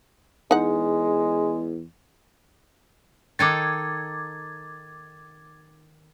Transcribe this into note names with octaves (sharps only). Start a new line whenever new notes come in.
E2 G#3 D#4 F#5
D#3 D#4 A4 D6 G#6 A6